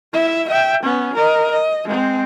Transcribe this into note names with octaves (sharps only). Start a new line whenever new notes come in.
E4 E5
E5 G5
B3 C#4
A#4 D#5
D#5
G#3 C4